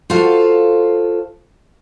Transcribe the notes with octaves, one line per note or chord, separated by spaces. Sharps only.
F4 F#4 A4 C5 F5